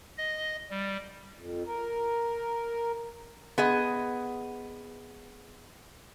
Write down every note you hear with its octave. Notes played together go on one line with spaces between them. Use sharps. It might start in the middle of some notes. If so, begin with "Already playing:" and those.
D#5
G3
F2
A#4
B3 G#4 D#5